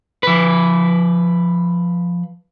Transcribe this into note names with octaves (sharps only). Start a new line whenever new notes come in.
F3 B4